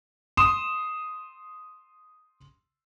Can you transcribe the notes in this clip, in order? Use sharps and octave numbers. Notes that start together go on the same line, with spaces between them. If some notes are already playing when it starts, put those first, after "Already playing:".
C6 D#6 E7